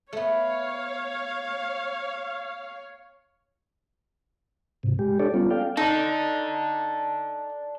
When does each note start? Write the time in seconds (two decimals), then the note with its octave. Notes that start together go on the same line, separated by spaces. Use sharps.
0.13 A3 B3 C#5 F5
4.83 G#2 C3
4.99 G#3 G4
5.20 D4 G4 A4 C#5 D5
5.34 G3 B3 C#4 F4
5.50 A4 D5 F5 G5
5.77 D4 D#4 A4